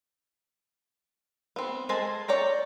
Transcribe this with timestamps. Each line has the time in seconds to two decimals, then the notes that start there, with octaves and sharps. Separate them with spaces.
1.56 B3 C4
1.89 G#3 A4 C5 G#5 A5
2.28 C#5 D5 G5 A#5